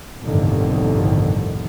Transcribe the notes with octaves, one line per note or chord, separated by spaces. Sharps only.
G1 C2 F2 A2 D3 D#3